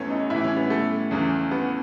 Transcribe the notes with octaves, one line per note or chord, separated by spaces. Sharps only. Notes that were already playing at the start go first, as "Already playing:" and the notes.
Already playing: E2 C#3 E3 A3 B3 C#4
D#4
A2 E3 E4
C#4
B3
A3
E2 C#3 E3
B3